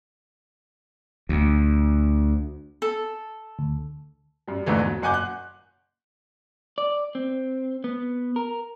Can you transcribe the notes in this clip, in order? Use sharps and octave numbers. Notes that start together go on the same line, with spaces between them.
D2
A4
D2
F#2 G3
A#1 E2 G#2 D3 E3 A3
F#3
F#1 F#5 G#5 D6 G6
F#6
D5
C4
B3
A#4